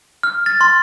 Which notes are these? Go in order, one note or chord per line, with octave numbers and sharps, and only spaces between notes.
F6
A6
C6